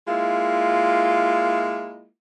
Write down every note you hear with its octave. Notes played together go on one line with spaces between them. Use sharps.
G#3 A#3 E4 F4